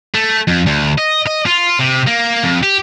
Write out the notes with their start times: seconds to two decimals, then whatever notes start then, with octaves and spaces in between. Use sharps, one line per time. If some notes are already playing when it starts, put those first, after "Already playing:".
0.14 A3
0.47 F2
0.66 D2
0.98 D#5
1.27 D#5
1.46 F4
1.79 C3
2.07 A#3
2.43 F2
2.63 G4